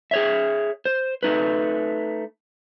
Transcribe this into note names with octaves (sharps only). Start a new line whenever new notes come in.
G#4 C#5 E5
C5
A3 D#4 B4